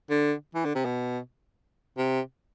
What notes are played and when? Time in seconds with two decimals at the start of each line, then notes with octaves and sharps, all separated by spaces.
0.10 D3
0.55 E3
0.65 D3
0.75 C3
0.85 B2
1.98 C3